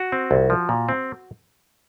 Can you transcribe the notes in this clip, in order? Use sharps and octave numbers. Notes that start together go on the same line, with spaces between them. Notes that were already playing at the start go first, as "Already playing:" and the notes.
Already playing: F#4
C4
C2
F3
A#2
C4